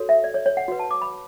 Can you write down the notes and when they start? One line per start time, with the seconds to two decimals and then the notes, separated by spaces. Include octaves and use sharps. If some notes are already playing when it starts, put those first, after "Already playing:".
Already playing: F#4 A4 C#5
0.09 E5
0.24 D5
0.34 C#5
0.46 C#5
0.57 F#5
0.68 F#4 B4
0.79 A5
0.91 D6
1.02 B5